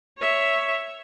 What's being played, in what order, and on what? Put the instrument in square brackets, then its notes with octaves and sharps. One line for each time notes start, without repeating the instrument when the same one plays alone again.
[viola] C#5 E5